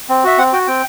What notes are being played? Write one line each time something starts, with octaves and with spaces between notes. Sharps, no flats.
C4
F#4 E5
C4 F#5
F#4 G5
C4 G5